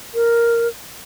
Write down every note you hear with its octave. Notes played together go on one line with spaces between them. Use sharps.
A#4